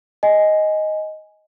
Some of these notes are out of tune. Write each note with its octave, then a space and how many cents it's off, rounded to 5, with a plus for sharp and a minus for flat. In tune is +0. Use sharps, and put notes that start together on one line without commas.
D#5 +5 G#5 +0